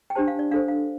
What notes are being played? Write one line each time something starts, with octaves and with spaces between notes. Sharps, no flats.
G5
D4 G4 C5 A5
F5
D5
D4 A4 C5 F5
F5